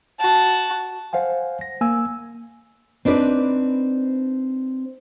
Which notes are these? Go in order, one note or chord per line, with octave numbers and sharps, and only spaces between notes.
F#4 A5
C5 F5 F#5 G#5
A#6
A#3 G#5 E6
C4 D4 D#4 B4 D5